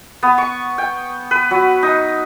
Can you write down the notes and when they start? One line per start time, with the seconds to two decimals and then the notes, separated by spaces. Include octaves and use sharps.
0.23 B3
0.38 C#6
0.78 G5
1.31 B4
1.51 F#3
1.83 D#4